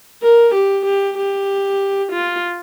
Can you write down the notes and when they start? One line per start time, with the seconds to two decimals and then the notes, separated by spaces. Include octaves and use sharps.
0.22 A#4
0.54 G4
0.86 G4
1.17 G4
2.12 F4